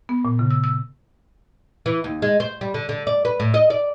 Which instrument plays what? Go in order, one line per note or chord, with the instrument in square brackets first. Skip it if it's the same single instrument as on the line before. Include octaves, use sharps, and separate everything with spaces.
[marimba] B3
A#2
C#3
E6
E6
[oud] E3
D#2
G#3
C5
G3
D3
D3
D5
B4
A2
D#5
D5